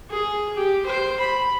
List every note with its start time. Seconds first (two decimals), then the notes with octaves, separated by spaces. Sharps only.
0.10 G#4
0.56 G4
0.86 C5
1.19 B5